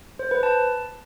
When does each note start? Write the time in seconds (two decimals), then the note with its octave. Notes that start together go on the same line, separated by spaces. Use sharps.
0.19 C5
0.31 B4
0.43 A5